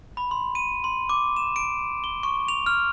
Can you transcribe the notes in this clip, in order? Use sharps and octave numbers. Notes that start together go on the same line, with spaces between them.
B5
C6
D#7
C6
D6
E7
D7
G7
C#6
F7
F6